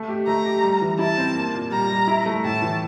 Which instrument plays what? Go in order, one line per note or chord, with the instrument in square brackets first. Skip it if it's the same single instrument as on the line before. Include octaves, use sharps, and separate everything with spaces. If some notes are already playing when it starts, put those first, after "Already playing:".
Already playing: [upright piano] A3
G4
[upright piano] A3 [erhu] A#5
[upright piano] G4
G3
E3
[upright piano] E4 [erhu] A5
[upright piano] C4
A#3
A#2
[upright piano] G3 [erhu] A#5
[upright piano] G3
E4
A3
[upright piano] A2 [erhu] A5
[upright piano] E3